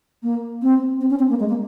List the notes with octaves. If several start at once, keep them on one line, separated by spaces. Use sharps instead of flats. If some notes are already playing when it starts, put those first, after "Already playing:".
A#3
C4
C4
C#4
C4
A#3
G#3
A#3